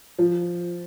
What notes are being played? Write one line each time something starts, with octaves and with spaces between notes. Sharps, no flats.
F3